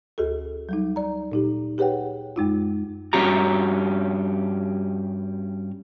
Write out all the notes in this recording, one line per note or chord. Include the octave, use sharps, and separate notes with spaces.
D2 F#4 G#4 A4
F#3 G3 D#4
D5 A#5
A#2 D#4 G4
G4 G#4 B4 C#5 F#5 G5
F#2 G#3 D#4 F4
G2 C#4 F#4 G4 A#5